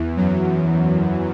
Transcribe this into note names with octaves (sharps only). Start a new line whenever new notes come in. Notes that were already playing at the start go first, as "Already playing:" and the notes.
Already playing: E2 E3
F#2 F#3